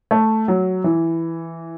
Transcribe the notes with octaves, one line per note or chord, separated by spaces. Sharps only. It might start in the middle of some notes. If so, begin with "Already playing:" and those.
A3
F#3
E3